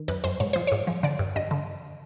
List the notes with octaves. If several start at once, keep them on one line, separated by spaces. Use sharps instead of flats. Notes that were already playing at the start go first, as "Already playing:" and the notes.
Already playing: D#3
F#2 B4
F#2 C5
G#2 C#5
F3 C5
G#2 C#5
F3
D3 D5
G2
G2 D#5
D3